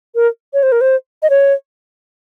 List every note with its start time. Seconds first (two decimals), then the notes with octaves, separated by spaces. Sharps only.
0.15 A#4
0.54 C#5
0.63 C5
0.72 A#4
0.81 C5
1.23 D#5
1.30 C#5